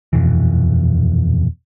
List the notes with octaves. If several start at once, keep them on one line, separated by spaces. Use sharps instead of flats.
D#1 F2 B2 E3